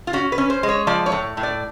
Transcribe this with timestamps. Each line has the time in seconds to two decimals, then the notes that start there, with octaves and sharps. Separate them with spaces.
0.07 F4
0.13 C#4 F#4
0.32 B4
0.38 C#4
0.50 C5
0.63 G#3
0.69 C#5
0.87 F3 D5
1.06 C#5
1.12 A2
1.37 A2
1.43 D5